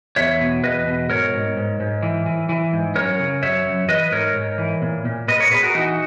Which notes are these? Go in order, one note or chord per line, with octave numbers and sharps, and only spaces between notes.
E2 C#5 E5
B2
E2 B4 D#5
B2
G#2 A#4 C#5
G#2
G#2
G#2
E3
E3
E3
G#2
F#2 A#4 C#5
C#3
F#2 C#5 E5
F#2
E3 B4 D#5
G#2 A#4 C#5
G#2
E3
A#2
A#2
A#2 B4 D#5
A#4 C#5
A#2 G#4 B4
F#4 A#4
E3 D#4 F#4